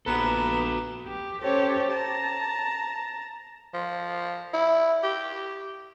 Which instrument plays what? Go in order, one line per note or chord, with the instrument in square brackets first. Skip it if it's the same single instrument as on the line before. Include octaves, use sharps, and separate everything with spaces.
[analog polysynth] A#1 B3 E7 [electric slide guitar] F#4 A4 [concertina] B4 [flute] A#5
[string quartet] G4
C#4 G4 A4 C5 C#5
A5 A#5
[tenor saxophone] F3
E4
G4